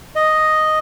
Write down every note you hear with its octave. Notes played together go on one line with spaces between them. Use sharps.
D#5